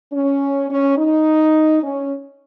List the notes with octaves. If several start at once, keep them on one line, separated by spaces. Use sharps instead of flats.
C#4
C#4
D#4
C#4